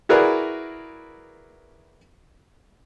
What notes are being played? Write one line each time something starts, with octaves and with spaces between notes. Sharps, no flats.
E4 F#4 G#4 A#4 B4 D5